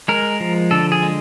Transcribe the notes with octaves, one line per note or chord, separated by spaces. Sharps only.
G#3 A#4
F3
D3 A4
G#4
G#3